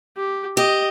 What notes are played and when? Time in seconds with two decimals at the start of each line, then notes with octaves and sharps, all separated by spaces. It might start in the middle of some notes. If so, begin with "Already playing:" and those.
0.16 G4
0.57 G4 D#5